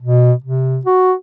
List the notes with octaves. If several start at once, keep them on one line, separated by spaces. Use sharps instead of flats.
B2
C3
F#4